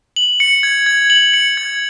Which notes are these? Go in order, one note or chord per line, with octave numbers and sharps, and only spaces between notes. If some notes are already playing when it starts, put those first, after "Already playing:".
F#7
C#7
G#6
G#6
F#7
C#7
G#6